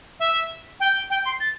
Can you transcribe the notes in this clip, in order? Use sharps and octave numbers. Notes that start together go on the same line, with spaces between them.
E5
G5
G5
C6
A6